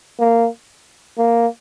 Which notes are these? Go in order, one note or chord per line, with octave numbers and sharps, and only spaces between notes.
A#3
A#3